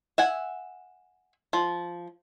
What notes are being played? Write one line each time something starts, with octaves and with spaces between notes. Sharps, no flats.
E5 F#5 G#5
F3